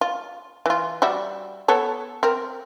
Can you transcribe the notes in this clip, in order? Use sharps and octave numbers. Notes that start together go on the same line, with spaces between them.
F4
E3 F4
G3 F#4 E5
B3 A4 C#5
C4 A#4